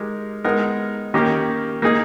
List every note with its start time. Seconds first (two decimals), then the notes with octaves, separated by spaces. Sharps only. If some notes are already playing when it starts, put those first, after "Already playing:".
Already playing: G#3 D#4 G4 A#4
0.44 G#3 B3 D#4 A#4
1.14 D#3 A#3 C#4 G4 A#4
1.82 A#3 D#4 G#4